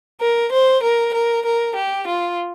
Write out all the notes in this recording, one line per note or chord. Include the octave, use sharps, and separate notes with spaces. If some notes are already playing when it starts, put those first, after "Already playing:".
A#4
C5
A#4
A#4
A#4
G4
F4